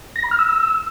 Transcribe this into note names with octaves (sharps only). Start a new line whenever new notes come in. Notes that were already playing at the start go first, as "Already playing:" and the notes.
A#6
B5
F6
E6